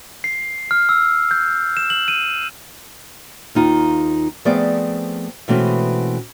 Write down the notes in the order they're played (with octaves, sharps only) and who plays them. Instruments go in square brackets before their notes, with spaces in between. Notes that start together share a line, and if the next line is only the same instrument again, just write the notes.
[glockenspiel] C7
F6
E6
G6
E7
F#7
D#7
[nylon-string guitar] D#2 D#4 F4
F3 A3 B3 C4 G#4 D5
B2 E3 G#3 A3 C4 C#4